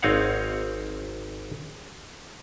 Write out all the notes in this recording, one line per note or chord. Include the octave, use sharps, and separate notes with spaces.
G#1 C4 D#4 C#5 F5 F#5